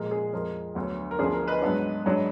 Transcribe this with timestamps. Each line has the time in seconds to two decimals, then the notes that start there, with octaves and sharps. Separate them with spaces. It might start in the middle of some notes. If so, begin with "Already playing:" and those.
Already playing: A#2 F3 G#3 A#4
0.11 G#4
0.33 F2 F3 G#3 A#4
0.75 D2 D3 F#3 B3
1.11 A#4
1.19 D2 D3 F3 B3 D4 G#4
1.33 A#4
1.48 B4 D#5
1.62 G#2 F#3 B3 D4
2.06 G#2 F#3 D4